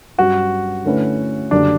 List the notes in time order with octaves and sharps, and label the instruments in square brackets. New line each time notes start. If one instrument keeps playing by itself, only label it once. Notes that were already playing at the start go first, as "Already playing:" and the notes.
[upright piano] G2 F#3 C#4 [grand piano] F#4
[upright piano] D3 A3 C#4 E4 B4
[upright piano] F#1 F#2 D3 G3 [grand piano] D4